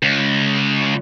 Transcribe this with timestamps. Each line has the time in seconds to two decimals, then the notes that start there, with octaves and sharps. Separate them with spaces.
0.02 C#2